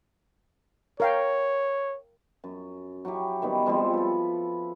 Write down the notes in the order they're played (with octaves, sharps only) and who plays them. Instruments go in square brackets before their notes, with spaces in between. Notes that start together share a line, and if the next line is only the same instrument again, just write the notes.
[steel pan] A#4 F5 G5 [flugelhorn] C#5
[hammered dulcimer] F#2
F#3 C#4 E4 G4
D#3 G3 B3
F3 G3 G#3 C4
A4 B4